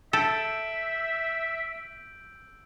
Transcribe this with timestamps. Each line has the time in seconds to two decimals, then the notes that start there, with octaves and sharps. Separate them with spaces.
0.13 A4 E5 E6 G6 D7